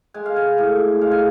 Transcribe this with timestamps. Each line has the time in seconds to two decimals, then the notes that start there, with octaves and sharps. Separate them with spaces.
0.14 G#3 G#5
0.26 F5
0.36 G#5
0.58 A2
1.01 G#3 F5
1.12 G#5